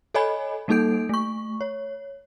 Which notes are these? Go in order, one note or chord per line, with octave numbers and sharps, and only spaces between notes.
A4 C#5 D#5 G#5 B5
G3 A#3 D#4 A4 G6 D7
A3 C#6
C#5